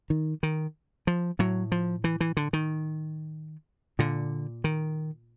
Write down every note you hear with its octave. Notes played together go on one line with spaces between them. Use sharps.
D#3
D#3
F3
A2 F#3
F3
E3
E3
D3
D#3
A#2 D3
D#3